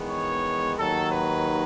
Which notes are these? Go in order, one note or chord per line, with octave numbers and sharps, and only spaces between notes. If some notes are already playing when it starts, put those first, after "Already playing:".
Already playing: E2 D#3 G#3 B3
C#5
D#2 D#3 F#3 A4
B4